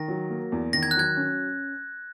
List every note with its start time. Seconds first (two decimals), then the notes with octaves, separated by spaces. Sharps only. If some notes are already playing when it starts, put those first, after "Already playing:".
Already playing: D#3 A#6
0.08 F#3
0.30 A#3
0.52 E2
0.73 D#3 A#6
0.83 G#6
0.91 F#6
0.95 F#3 G#6
1.17 C#4